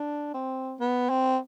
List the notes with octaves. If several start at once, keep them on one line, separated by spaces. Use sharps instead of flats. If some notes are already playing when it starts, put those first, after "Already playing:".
Already playing: D4
C4
B3
C4